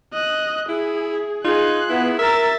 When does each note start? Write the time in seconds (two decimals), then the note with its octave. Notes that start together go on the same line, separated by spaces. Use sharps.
0.14 D#5 F#6
0.69 E4 G#4
1.45 D#4 F4 G#4 F#6
1.89 B3 E4
2.19 A#4 E5 E6 A6